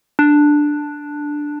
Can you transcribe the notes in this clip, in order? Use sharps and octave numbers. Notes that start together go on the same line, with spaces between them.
D4